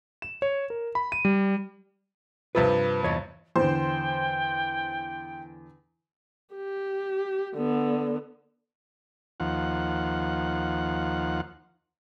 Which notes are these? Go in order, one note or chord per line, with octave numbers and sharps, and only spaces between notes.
E7
C#5
A#4
B5
D#7
G3
G2 C3 F3 B4
E2 C#5 D#5
E2 D3 C5 G5
G4
D3 B3
D#2 F3 F#5